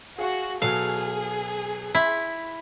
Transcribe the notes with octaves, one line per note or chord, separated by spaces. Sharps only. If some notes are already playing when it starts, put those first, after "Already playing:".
F#4 G#4 F5
B2 F#3 G#4 A4 F5
E4 C6 B6